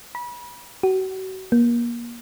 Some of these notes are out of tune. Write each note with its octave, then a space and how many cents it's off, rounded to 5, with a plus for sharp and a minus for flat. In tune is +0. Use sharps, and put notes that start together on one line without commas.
B5 -30
F#4 +35
A#3 +30